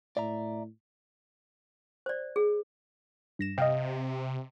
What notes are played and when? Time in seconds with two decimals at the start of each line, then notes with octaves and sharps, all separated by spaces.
0.17 A2 D5 E5 A#5
2.06 C5 D5
2.36 G#4
3.39 G2 A#6 E7
3.58 C3 D#5 F5 G5